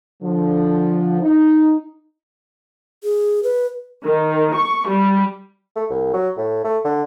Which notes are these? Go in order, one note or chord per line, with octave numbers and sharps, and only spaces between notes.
D3 F3
D#4
G#4
B4
D#3
C#6
G3
A3
C2
F#3
A2
A3
D3